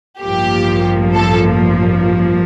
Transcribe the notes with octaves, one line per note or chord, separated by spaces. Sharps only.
A1 G2 F3 A#3 G4
A4